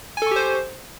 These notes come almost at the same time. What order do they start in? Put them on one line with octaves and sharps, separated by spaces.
G#5 A4 C#6 G4 C5